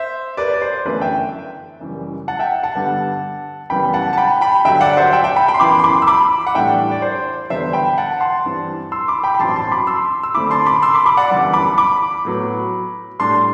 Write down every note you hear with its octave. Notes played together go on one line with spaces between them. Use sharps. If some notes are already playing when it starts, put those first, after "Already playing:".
Already playing: C5 E5
B4 D5
D5
C5
G1 F#2 E3 A3 E4 B4
E5 G5
F#1 F#2 E3 G3
F#5 A5
E5 G5
F#5 A5
G2 D3 G3 B3
F#1 F#2 E3 G3 B3 G5 B5
F#5 A5
A5
G5 B5
G5 B5
G2 D3 F#3 E5 G5
D5 F#5
C5 E5
E5 G5
E5 G5
G5 B5
G5 B5
C6
F#2 E3 B3 E4 B5 D6
C6
B5 D6
E6
B5 D6
F#5
A2 E3 G3 D4 E5 G5
D5
C5
E2 D3 G3 B3 D4 C5 E5
G5 B5
F#5 A5
A5 C6
G2 E3 G3 C4
C6 E6
B5 D6
G5 B5
B5
A1 G2 F#3 C4 E4 A5 C6
A5 C6
B5 D6
C6 E6
E6
F#2 D3 A3 C4 E4 B5 D6
A5 C6
B5 D6
C6 E6
B5 D6
B5 D6
D5 F#5
G1 F#2 E3 G3
B5 D6
B5 D6
A2 F#3 B3
A2 G3 D4 A5 C6